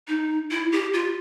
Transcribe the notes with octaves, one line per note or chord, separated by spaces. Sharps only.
D#4
E4
G4
F4